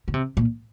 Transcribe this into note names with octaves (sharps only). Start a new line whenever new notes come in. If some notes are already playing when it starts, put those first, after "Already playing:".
D3
C3
A#2